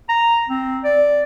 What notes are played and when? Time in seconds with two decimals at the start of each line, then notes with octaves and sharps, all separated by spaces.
0.09 A#5
0.49 C4
0.84 D5